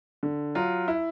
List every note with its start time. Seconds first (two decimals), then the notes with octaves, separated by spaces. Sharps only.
0.23 D3
0.55 F#3 F4
0.88 E4